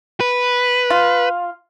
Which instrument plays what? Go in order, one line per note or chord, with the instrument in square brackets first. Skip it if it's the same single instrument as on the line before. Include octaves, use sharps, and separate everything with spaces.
[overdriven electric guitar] B4
[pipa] F4